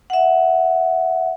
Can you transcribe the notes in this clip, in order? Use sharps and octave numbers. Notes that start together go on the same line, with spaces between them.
E5 F#5